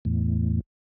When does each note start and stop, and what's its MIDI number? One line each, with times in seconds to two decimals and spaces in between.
0.05 0.60 40
0.05 0.60 45